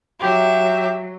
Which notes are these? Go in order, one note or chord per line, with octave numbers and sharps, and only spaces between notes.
F#3 G4 E5